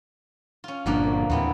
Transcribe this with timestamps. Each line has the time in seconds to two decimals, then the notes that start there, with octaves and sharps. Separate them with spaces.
0.64 C#4 F4
0.86 G1 A#2 D3 F3 A#3 D4
1.30 D#2 A2 E3 B3 C4